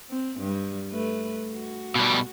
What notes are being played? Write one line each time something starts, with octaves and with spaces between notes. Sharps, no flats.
C4
G2 G3
A3 B4
F#4
B2 G3